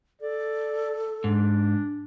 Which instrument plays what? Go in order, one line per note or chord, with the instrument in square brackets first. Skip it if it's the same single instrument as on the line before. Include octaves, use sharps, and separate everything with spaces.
[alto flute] A4 [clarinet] D5
[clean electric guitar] G#2 [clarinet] D4